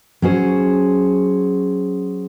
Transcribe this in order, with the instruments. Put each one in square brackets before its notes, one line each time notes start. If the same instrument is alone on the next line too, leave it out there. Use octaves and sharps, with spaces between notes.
[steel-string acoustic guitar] F#3 C#4 G#4 C5